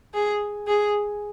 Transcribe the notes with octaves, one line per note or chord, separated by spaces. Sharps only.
G#4
G#4